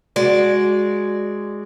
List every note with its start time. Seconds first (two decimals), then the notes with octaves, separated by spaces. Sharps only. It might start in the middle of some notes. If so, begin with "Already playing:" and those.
0.16 G#3 F#4 D5